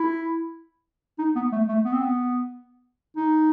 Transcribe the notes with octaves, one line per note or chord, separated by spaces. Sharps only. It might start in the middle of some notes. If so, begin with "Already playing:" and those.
Already playing: E4
D#4
B3
A3
A3
B3
C4
B3
D#4